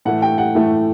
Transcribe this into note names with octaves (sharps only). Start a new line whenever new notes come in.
A2 E3 A3 F#5
G5
F#5
A2 E3 A3